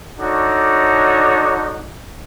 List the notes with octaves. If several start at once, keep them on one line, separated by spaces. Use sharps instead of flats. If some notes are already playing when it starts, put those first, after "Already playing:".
D4 D#4 F#4 A4 C#5 D5